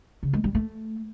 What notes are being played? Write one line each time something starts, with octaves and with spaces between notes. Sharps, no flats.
C#3
G#3
G3
A3